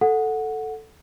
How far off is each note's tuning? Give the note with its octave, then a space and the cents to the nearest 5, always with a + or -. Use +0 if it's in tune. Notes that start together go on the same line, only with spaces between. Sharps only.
A4 +0 F#5 -10